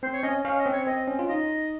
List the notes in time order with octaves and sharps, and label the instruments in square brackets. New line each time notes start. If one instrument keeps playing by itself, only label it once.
[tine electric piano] C4 [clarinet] C5
[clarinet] C#5
[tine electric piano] C#4 [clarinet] D#5
[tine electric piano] C#4 [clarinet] F5
[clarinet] D#5
[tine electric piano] C4
[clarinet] C#5
[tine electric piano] C4 [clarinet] D#5
[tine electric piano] C#4
F4
[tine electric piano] D#4 [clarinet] D#5